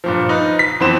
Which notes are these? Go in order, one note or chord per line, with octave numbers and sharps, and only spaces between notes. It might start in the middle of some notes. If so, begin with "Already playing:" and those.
G2 A#2 F3
D#4 B4
B6
F2 E3 B3 C4 C5 E7